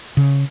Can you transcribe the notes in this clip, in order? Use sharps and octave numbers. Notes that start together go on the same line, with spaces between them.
C#3